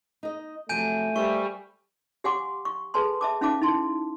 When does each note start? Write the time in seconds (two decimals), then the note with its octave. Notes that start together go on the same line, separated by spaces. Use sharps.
0.23 D#4 D#5
0.69 C3 F3 F#3 A3 G#5 G6 D#7
1.16 G3 A#3 C5 E5 C#6
2.24 G4 F5 F#5 G#5 C6 D6
2.65 C#6
2.94 G#4 A4 B4 G#5 A5 C6
3.21 E5 A5 D6
3.41 C#4 D#4 E5 F5 A5 D6
3.61 D#4 E4 A5 C6